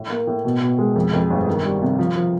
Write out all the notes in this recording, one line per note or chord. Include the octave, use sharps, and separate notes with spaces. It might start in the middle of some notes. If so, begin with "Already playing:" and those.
Already playing: A2
A#3
A2
B2
B2
G#3
F2
F2
G1
D#3
G3
C3
F3
F3